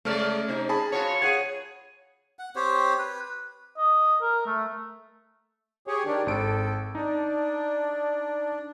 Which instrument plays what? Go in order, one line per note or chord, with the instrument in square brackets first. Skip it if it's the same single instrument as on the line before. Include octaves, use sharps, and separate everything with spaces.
[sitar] C#3 G#3 D5 [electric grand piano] A3 F6
[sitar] C3 D#4
[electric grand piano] G#4 A5 B5
[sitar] F4 F#4 C#5
[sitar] G#4 [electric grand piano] C#5 F#5 G#6
[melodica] F#5
C4 G4 C5 C#5
B4
[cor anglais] D#5
A#4
A3
[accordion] G4 G#4 C#5
D#3 D4 G4
[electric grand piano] G#1 D7 [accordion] A4
[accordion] D4 [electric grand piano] D#4